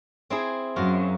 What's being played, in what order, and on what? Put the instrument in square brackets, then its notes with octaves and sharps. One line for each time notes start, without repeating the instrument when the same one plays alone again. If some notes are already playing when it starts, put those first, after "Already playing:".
[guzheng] C4 E4 G#4
[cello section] F#2 [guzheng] F4 F#4 A#4